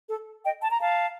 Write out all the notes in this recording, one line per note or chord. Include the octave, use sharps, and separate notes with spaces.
A4
D#5 G5
A5
A#5
F5 A5